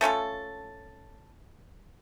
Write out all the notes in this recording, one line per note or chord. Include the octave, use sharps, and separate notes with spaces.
A3 C#4 F4 A4